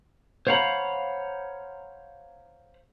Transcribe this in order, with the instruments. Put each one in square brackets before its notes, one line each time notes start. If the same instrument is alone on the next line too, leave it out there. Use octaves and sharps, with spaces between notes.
[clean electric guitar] C5 C#5 F5 F#5 A#5 B5